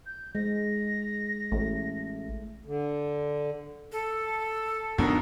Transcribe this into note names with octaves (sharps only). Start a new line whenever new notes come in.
G6
G#3 A#6
A1 A3
D3
A4
F2 B2 D#3 D4